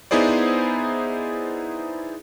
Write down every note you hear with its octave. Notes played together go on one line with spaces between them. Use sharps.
B3 D#4 E4 G#4 C5 D5